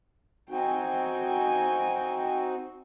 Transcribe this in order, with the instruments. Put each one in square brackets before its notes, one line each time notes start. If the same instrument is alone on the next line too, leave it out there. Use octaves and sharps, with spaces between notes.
[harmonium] C4 D#4 F#4 [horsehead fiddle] G5 G#5